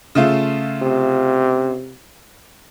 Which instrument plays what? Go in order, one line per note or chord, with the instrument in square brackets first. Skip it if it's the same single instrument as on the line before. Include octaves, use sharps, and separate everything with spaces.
[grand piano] C#3 A3 F4
[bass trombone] C3